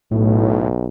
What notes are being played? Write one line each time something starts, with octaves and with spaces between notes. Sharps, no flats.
B1 A2